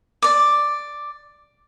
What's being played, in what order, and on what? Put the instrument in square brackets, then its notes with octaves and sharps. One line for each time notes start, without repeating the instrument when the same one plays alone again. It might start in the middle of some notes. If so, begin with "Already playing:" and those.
[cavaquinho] D5 D6